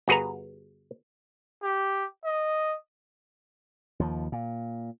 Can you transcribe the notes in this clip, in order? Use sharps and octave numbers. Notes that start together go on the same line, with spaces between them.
G1 F#4 G#4 B4 A#5
G4
D#5
D#2 F3
A#2